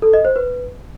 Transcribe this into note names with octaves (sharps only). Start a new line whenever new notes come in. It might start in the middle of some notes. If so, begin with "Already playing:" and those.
A4
D#5
C5
B4